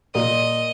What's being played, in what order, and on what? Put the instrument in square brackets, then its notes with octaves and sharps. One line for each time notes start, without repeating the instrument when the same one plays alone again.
[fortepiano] A#2 [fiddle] D#5